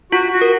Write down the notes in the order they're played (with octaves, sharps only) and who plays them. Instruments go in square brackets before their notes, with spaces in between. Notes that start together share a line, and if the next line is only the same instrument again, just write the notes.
[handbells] F4 [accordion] F#4
[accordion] F#4
[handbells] A#4